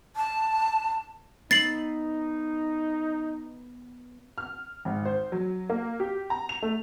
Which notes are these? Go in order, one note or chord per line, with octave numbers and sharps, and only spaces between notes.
A5
B3 D#4 E6 A6 C7 F#7
F6
G#1
C5
F#3
A#3
G4
A#5
F7
A3